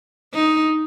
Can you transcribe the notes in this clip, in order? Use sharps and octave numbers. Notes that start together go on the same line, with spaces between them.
D#4